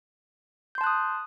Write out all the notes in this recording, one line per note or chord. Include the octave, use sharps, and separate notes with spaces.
A5 C6 D#6 F#6 G6